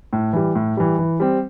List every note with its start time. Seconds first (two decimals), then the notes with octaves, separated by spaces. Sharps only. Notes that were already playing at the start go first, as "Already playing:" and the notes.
0.13 A2
0.33 E3 G3
0.55 A2
0.77 E3 G3
0.99 E3
1.20 G3 C4